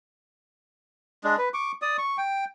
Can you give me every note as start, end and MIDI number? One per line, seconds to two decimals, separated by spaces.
1.24 1.36 56
1.24 1.36 62
1.38 1.49 71
1.54 1.72 85
1.54 1.72 86
1.82 1.97 74
1.82 1.97 87
1.98 2.17 85
2.18 2.45 79